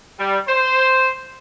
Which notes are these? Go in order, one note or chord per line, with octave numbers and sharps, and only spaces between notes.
G3
C5